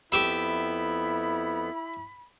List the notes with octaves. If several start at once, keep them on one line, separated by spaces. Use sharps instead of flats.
F2 B3 E4 G4 E5 B5